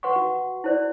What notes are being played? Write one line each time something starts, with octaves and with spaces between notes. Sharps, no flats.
B4 F#5 C6 C#6
F#4
E4 C5 D5